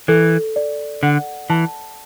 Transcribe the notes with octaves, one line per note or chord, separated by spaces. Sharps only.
E3 A4
D5
D3 F#5
E3 A5